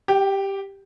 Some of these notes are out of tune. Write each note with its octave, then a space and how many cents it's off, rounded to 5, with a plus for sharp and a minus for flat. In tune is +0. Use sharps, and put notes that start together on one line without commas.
G4 +0 G5 -40